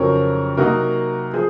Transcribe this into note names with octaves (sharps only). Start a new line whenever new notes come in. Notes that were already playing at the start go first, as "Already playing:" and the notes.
Already playing: F2 C#3 F#3 C4 D#4 A#4 C#5
C3 F#3 A#3 D#4 F#4 A#4
F3 G#4 C5